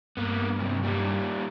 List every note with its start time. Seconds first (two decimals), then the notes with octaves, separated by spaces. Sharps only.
0.17 G2 A#3 B3
0.59 F#2 C3
0.84 A#2 G3